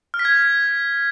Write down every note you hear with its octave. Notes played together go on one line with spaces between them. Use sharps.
F6
B6
G#6